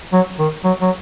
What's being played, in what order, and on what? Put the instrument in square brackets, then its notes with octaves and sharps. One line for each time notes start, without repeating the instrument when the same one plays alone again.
[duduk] F#3
D#3
F#3
F#3